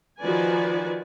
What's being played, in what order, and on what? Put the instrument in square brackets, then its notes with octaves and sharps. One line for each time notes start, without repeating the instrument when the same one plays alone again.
[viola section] D#3 F3 F#4 B4 D5 G#5